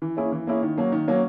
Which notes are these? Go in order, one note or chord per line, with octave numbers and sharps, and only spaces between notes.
E3
A#3 C#4 E4 G#4
E3
A#3 C#4 E4 G#4
D#3
F#3 A#3 C#4
D#3
F#3 A#3 C#4